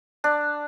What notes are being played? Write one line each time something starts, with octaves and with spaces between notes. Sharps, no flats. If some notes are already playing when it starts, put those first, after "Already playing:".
D4